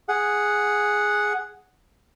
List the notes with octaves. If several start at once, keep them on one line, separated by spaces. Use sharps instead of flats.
G#4 F#5